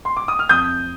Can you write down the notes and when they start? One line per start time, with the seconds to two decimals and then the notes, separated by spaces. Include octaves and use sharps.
0.05 C6
0.17 D6
0.28 D#6
0.39 F6
0.49 F2 D#6 G6